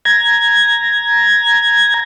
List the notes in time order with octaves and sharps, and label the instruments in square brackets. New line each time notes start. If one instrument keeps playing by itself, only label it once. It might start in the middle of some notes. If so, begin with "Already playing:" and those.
[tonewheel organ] A#5 G#6